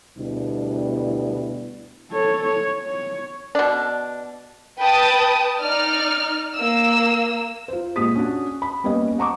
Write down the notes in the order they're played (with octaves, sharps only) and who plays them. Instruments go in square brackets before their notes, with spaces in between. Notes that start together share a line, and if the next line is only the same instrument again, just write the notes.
[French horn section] D2 B2 G3 D4 E4
[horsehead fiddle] A4 C#5
C#5
C#5
[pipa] B2 D4
[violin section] B4 G5 A5 D#6
D#4 D5 F6
A#3 E6
[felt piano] F4 C5
A#2 G#3 F4 G4 D#6 B6
C#4 D4 F#4
B5
G3 A#3 B3 C#4 G4 D#5
F#5 A#5 C#6 D6